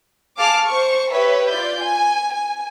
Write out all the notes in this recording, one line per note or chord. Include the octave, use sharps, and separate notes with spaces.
G#4 F5 A5 D6 F6
C5 C#6
G4 B4 C#5 E5
F4 D5 G6
G#5
G#5